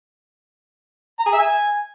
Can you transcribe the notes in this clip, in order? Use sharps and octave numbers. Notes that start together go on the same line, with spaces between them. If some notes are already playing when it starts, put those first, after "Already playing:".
A#5
G#4
E5
G#5